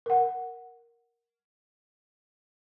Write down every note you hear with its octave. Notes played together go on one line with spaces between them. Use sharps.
A#4 F#5